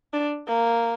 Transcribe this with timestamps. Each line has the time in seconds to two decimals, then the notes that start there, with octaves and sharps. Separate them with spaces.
0.13 D4
0.48 A#3